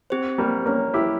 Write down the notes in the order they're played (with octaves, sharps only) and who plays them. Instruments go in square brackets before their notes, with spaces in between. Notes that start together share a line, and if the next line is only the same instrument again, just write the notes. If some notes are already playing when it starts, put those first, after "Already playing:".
[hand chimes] C4 G4 C5
[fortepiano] G3 A#3
A#3 C#4
E4 G4